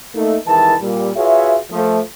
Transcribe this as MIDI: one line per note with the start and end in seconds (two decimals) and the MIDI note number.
0.15 0.36 57
0.15 0.36 58
0.15 0.36 63
0.47 0.74 36
0.47 0.74 51
0.47 0.74 52
0.47 0.74 56
0.47 0.74 64
0.47 0.74 81
0.81 1.11 46
0.81 1.11 55
1.15 1.56 65
1.15 1.56 66
1.15 1.56 68
1.15 1.56 71
1.15 1.56 73
1.15 1.56 76
1.71 2.00 53
1.71 2.00 57